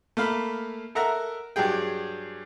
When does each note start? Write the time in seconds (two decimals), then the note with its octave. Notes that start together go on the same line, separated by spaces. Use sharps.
0.17 A3 A#3 F5 B5
0.95 A4 A#4 E5 F#5 A#5
1.56 G2 F#3 G4 G#4 G5